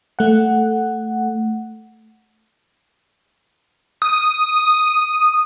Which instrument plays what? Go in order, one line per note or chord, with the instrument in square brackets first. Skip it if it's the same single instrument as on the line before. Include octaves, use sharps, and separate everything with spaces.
[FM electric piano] A3 F#5
[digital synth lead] D#6